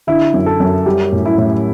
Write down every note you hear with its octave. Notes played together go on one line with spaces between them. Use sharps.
D3 E4
F#2
A4
F#2
G3 G4
A2
E4
A2